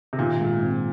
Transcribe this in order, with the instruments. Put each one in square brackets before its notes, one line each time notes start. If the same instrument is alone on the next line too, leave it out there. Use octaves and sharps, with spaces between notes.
[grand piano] C3
[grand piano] A#2 [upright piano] D#3
[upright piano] G#2
C4